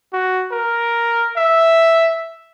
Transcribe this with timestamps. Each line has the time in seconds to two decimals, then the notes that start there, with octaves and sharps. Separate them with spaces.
0.13 F#4
0.52 A#4
1.37 E5